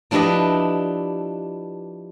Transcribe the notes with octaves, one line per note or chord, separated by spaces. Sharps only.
F3 D4 E4 G4 B4 D#5